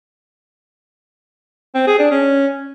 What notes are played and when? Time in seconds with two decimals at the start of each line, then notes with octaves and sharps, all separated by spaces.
1.75 C4
1.87 G#4
1.99 D4
2.11 C#4